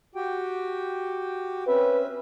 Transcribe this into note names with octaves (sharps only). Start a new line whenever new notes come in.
F#4 G4 G5
C4 C#4 B4 E5